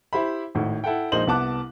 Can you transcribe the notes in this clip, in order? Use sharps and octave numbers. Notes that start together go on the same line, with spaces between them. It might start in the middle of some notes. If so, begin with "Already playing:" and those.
E4 G4 C5 E5 B5
G#1 A2
E4 A4 F#5 G5
A#1 G#3 A#3 D#4 C5 F#7
C2 B3 A5 D6 F#6